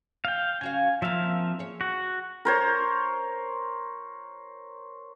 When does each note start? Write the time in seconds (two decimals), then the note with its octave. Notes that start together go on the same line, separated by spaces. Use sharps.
0.25 F5 G5
0.61 C#3 F#4 F5 G#5
1.02 F3 A#3 C4 E5 F5
1.59 G#4 C#5
1.81 F#4
2.45 A#4 C5 C#5